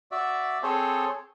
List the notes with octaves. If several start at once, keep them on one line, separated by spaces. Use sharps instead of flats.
F#4 D5 E5
C4 G#4 A4 C5 C#5